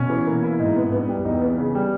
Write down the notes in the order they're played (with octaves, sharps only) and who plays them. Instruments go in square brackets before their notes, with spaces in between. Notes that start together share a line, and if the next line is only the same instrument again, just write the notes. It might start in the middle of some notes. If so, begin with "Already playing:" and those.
Already playing: [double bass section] B2 [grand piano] C#4
[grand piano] E3
A#3
E4
[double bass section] G#2 [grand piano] D#4
[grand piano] B3
[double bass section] G2 [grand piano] B3
[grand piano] G3
[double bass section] E2 [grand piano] D#4
[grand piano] B3
C#3
G3